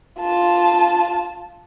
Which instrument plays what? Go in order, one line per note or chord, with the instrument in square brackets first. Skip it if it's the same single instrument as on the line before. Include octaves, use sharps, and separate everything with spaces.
[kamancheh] F4 A5